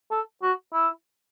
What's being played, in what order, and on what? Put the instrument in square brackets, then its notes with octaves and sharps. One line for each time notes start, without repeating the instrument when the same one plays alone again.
[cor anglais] A4
F#4
E4